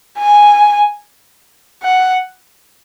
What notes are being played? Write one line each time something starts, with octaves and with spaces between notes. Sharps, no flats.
G#5
F#5